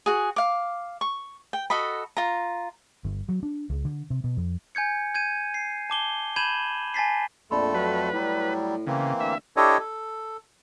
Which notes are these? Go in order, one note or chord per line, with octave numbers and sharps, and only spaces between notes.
F#4 G#4
F5 D6
C#6
G5
F#4 A4 D#5 B5
F4 A#5
G1
F#3
D4
C#2
D3
C3
B2
F2
G#5 G6 G#6 C#7
G6 G#6 D#7
C7
A5 D6 G7
B5 G6 G#6 D#7 E7 F#7
G#5 A5 A6 B6 C7
A#1 F2 A3 A4 D5 B5 C6
F#3 B4
A2 F#3 G3
C#3 E3 A#3 C4
D2 E5
D4 E4 G4 A4 C#5 D#5
A4